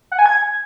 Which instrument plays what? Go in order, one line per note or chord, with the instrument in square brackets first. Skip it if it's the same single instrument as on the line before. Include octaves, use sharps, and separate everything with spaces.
[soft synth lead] F#5
G#5
G#6